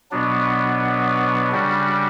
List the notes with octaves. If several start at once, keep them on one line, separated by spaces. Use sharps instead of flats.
B2 F#3 B3 D4
C#3 G3 D4 F#4